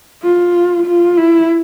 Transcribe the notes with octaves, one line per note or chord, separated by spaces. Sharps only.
F4
F4
E4